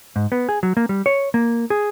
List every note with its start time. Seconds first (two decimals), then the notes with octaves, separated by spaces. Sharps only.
0.16 G#2
0.32 B3
0.49 G#4
0.63 F#3
0.77 A#3
0.89 G3
1.06 C#5
1.34 A#3
1.70 G#4